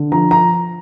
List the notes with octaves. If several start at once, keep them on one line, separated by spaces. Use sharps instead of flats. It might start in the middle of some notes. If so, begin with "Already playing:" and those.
Already playing: D3
F3 A#5
A#5